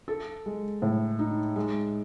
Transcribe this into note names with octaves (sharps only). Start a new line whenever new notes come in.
A4
G#3
A2
D#4
G#3